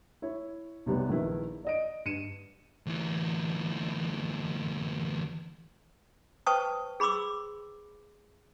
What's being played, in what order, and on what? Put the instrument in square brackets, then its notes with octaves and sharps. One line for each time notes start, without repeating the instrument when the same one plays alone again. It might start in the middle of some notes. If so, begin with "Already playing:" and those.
[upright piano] E4 C#5
B1 C3 G3 B3
A#1 D#3 E4 B4
D5 D#5 D7
G2 C#7 D#7 E7
[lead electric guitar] D2 E3
[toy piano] B4 C5 G5 A5 C#6 D#6
G#4 B5 C6 D6 E6